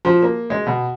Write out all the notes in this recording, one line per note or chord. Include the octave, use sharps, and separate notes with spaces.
F3
A#3
G#3
B2